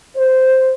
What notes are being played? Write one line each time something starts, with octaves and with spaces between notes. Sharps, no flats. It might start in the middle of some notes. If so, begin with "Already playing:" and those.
C5